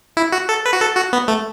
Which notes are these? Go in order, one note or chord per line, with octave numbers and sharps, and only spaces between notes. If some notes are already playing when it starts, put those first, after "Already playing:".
E4
F#4
A4
B4
F#4
A4
F#4
B3
A3